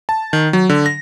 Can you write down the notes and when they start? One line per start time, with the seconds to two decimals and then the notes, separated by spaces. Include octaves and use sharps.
0.09 A5
0.33 D#3
0.53 F#3
0.69 D3
0.86 A#6